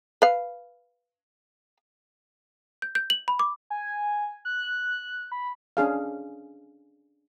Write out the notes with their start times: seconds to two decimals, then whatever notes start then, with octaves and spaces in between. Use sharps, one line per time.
0.22 B4 F5
2.82 G6
2.95 G6
3.10 F#7
3.28 B5
3.39 D6
3.70 G#5
4.45 F#6
5.32 B5
5.77 C#4 D4 G#4 F5